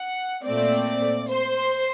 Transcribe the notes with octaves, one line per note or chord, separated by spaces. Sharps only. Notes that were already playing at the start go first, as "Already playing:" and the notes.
Already playing: F#5
A#2 A3 C4 D5
C5